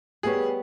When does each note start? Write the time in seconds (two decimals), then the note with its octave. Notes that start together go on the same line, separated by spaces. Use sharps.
0.23 G3 B3 G4 G#4 C#5